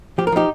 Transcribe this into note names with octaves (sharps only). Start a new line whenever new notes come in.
F3 G4
A#4
F3 D#4 G4